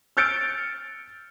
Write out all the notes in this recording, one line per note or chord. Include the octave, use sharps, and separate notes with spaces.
E6 F6 G6 A6 C#7 D7